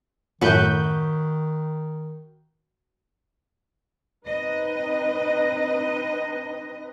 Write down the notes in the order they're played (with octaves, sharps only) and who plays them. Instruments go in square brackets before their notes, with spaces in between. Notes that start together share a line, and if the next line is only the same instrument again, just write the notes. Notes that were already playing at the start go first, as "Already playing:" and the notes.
[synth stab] F#2 A2 G6 [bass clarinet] D#3 [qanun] F#4 B4
[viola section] C4 D#4 B4 [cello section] D#5